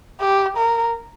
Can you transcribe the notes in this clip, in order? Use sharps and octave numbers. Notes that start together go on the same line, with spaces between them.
G4
A#4